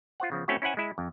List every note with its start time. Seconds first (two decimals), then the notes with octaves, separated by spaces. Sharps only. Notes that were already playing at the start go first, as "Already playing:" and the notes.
0.20 F4 C5 F#5
0.32 C#3 F3 B3
0.48 A3 C4 C#4 E4 F#4
0.62 C#4 E4 C5 F#5 G#5
0.77 G#3 E4
0.98 F2